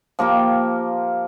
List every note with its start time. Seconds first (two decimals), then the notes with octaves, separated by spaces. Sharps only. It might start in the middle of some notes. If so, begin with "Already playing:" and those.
0.19 F3 A#3 G4 G5